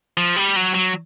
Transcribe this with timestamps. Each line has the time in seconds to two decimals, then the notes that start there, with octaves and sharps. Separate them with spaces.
0.17 F3
0.36 G3
0.56 F#3
0.74 F#3